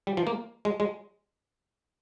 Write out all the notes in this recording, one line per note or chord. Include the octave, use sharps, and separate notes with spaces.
G3
F3
A#3
G#3
G#3